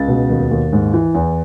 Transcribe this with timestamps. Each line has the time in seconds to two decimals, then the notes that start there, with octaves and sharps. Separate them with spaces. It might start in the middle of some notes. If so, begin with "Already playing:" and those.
Already playing: C#2 A6
0.08 B2
0.30 D#2
0.51 D#2
0.73 G#2
0.94 E3
1.15 E2